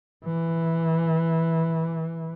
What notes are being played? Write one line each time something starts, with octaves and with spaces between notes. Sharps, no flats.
E3